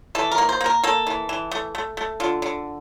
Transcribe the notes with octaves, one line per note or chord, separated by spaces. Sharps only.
E3 A4
A#4
A#3
C5
A#3
A#4
A#3 A4
E3
E3
A3
A3
A3
D3 F4
D3